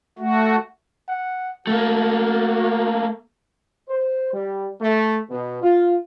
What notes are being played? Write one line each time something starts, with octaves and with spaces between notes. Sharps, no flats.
A3 F#4
F#5
A3 A#3 F#4
C5
G3
A3
B2
F4